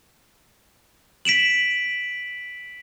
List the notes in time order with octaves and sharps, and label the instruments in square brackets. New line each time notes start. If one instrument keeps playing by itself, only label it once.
[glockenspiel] B6 D7 E7 F#7